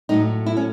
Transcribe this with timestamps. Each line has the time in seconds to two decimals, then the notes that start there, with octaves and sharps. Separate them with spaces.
0.09 A2 F#3 A3 D#4
0.46 E4
0.57 C#4